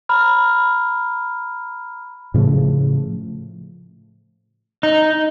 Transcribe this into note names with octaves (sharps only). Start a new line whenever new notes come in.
A#5 B5 F6
A2 C#3 F3 A3
D#4